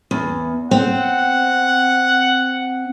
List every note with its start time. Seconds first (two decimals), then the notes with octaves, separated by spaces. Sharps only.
0.11 E2
0.71 C4 F#5